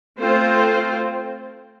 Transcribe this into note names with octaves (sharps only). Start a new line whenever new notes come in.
A3 C4 F4 C5